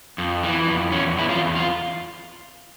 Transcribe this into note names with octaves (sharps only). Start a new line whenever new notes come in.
F2
E3
F2
E2 C#4
E2 E4
F4
E2
F4